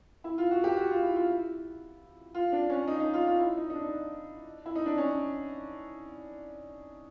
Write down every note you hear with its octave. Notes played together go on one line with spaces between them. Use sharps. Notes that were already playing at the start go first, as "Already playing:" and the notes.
E4
F4
F#4
G4
F#4
F4
E4
F4
E4
F4
D4
C#4
D#4
D#4
F4
F4
E4
D#4
D#4
D4
E4
D#4
D4
C#4